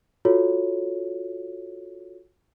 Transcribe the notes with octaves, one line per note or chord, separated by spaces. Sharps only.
F4 F#4 A4 C#5